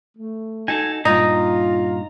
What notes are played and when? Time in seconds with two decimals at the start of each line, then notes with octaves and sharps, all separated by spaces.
0.18 A3
0.68 D#4 F#4 A4 G#5
1.05 G2 A#2 D#4 F4 A#5